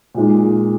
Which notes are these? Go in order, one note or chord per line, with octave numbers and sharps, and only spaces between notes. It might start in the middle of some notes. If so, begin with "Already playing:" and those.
A#2 G#3 D#4